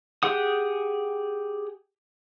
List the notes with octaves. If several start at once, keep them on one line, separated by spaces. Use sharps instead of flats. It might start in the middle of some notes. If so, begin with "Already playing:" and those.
G4 G#4 F#5 D#6